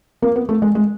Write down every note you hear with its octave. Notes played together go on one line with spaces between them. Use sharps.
A#3
B3
A3
G#3
G#3